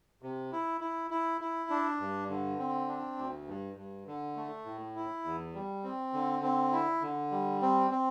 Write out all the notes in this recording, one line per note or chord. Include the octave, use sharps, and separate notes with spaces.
C3
E4
E4
E4
E4
D4
G2
D3
C4
D4
D2
G2
G2
D3
A3
A2
E4
E2
G3
C4
D3
C4
E4
D3
G3
C4
C4